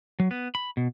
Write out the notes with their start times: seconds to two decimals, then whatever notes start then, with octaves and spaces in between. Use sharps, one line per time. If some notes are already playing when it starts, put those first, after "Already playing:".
0.20 F#3
0.31 B3
0.55 B5
0.77 B2